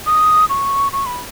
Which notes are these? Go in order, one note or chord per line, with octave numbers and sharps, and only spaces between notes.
D#6
C#6
C#6
B5